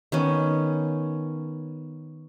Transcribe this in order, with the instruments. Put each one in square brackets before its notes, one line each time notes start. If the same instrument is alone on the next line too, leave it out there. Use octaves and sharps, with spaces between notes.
[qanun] D#3 B3 C#4